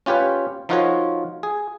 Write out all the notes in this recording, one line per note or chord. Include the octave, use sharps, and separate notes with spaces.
C#4 F4 G4 B4 C#5
F3 D#4 F4 F#4 A#4 C#5
G#4